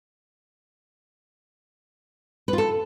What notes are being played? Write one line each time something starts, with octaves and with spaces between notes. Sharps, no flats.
B4
F4
A4